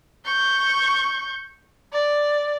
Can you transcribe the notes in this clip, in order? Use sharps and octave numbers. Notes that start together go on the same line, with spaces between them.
C#6 G6
D5